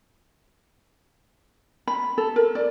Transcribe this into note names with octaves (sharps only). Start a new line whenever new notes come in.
B5
A4
A#4
D5